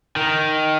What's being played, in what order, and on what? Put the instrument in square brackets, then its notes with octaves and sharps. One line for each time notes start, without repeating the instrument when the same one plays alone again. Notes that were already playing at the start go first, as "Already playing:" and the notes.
[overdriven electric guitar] D#3